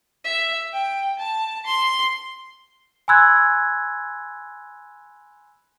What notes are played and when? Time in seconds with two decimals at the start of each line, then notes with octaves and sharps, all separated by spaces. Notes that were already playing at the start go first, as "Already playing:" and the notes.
0.24 E5
0.73 G5
1.19 A5
1.66 C6
3.08 G#5 B5 C6 E6 F#6 G#6